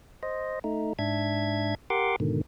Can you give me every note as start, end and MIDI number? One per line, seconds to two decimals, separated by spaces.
0.23 0.59 72
0.23 0.59 75
0.64 0.93 57
0.64 0.93 63
0.99 1.75 44
0.99 1.75 62
0.99 1.75 76
0.99 1.75 92
1.90 2.16 67
1.90 2.16 70
1.90 2.16 78
1.90 2.16 84
1.90 2.16 86
2.20 2.41 44
2.20 2.41 47
2.20 2.41 50
2.20 2.41 51